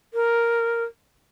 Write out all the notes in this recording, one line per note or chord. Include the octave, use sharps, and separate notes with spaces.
A#4